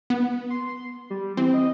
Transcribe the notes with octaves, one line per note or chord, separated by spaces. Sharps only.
B3
C6
G3
E3 C4
D#5